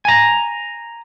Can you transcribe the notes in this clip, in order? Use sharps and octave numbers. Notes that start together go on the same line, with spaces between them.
G#5 A#5